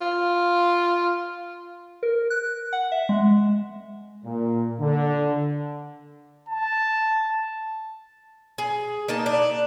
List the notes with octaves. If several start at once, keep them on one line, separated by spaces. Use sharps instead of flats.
F4
A#4
F#6
F#5
E5
G#3
A#2
D3
A5
G#4
A#3 D#4 A5
D4